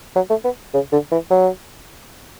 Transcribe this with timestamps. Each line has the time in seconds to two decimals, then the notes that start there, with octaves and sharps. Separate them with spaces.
0.16 F#3
0.30 A3
0.45 B3
0.74 C#3
0.92 D3
1.12 E3
1.31 F#3